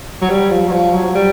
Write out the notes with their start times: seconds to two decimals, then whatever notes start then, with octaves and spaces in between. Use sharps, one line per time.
0.22 F#3
0.30 G3
0.51 F3
0.68 F#3
0.72 F3
0.94 F#3
1.15 G3